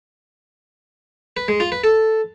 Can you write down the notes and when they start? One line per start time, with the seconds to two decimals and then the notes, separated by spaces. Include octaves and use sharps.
1.37 B4
1.48 G#3
1.60 F4
1.72 B4
1.84 A4